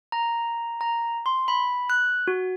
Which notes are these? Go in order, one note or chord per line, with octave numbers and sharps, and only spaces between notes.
A#5
A#5
C6
B5
F#6
F#4